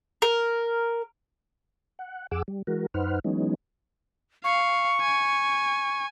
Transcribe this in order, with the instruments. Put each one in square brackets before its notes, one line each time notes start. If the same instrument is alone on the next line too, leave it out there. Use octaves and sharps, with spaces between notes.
[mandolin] A#4
[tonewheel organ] F#5
F2 G#4 F#5 D6 E6
G3
E3 G#3 F#4 A#4
F#2 D#4 B4 C5 F#5 F6
E3 F#3 G#3 B3 C#4 D#4
[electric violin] F5 [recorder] C#6
[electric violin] G#5